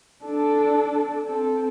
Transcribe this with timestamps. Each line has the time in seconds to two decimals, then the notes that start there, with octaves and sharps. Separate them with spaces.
0.25 D4 A4
1.26 C4 A4